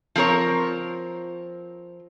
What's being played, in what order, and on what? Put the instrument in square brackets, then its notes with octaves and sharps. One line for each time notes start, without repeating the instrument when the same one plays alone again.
[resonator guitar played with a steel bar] F3 C4 A#4 C#5